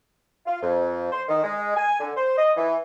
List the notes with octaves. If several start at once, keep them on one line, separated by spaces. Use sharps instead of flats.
F4
F2
C5
D#3
G#3
G#5
D3
C5
D#5
E3